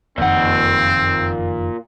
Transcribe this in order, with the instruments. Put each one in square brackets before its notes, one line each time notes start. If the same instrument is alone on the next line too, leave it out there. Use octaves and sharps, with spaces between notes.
[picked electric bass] F#1 F2 D#3 [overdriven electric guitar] A#2 F#5 [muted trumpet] C4